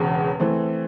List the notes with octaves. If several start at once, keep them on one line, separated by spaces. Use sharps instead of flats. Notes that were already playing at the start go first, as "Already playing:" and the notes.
Already playing: E1 E2 C#3
E3 A3 C4